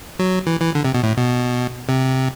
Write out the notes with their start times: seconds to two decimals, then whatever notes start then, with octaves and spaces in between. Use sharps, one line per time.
0.19 F#3
0.47 E3
0.61 E3
0.75 D3
0.85 C3
0.95 B2
1.03 A2
1.17 B2
1.89 C3